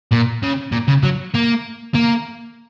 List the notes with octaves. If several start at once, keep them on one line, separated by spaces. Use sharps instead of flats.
A#2
C#3
A#2
C#3
F#3
A#3
A#3